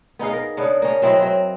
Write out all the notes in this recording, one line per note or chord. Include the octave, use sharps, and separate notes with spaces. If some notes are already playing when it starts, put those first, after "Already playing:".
B3 D#4 G#4 F5
A#4
C#3 B3 D4
A#3 C#4
F#3 C4 E4 D#5
F#3 C4